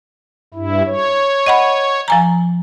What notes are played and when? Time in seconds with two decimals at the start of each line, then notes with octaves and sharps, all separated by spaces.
0.54 G2 E4
0.86 C#5
1.46 D#5 F#5 B5
2.08 F3 G#5 A#5